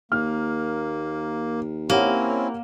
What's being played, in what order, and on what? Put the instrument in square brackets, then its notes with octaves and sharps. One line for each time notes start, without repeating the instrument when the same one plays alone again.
[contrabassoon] D#2 [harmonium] A#3 [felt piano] F6
[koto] A#3 [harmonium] C4 C#4 E4 [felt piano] G4 C#5 F#5